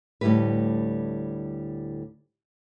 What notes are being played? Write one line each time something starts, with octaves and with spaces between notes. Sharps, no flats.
D2 A2 G3 E4 G4 B4